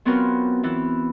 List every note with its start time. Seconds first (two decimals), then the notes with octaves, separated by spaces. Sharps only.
0.05 F#3 B3 C4 F4 F#4 A#4
0.63 E3 B3 E4